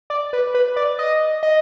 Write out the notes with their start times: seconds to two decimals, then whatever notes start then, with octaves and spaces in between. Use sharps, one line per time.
0.10 D5
0.33 B4
0.55 B4
0.76 D5
0.99 D#5
1.43 D#5